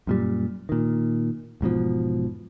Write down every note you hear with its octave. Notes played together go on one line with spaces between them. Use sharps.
F#2 A#2 G3
A#2 D#3
E1 G#2 B2 F3